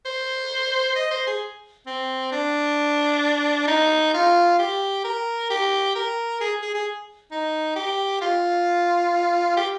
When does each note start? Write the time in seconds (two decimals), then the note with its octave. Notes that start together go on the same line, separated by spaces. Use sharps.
0.05 C5
0.96 D#5
1.11 C5
1.27 G#4
1.87 C4
2.32 D4
3.68 D#4
4.14 F4
4.59 G4
5.04 A#4
5.50 G4
5.95 A#4
6.41 G#4
6.62 G#4
6.75 G#4
7.31 D#4
7.76 G4
8.21 F4
9.57 G4